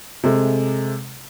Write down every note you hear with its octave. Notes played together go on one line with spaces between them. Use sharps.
C3 G#3 A3